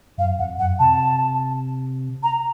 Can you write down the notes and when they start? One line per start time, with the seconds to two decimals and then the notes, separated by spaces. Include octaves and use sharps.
0.18 F#2 F5
0.38 F2 F#5
0.58 F#2 F#5
0.79 C3 A5
2.23 A#5